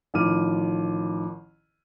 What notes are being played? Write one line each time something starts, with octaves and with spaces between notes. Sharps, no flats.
A1 D#3 F3 D6 F6 D#7